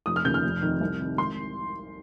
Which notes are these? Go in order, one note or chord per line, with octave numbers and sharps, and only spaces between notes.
F1 D#6
F6
D#2 C#3 G6
F6
F1
F2 C3 D#3
C2
C3 D#3
G#1 C6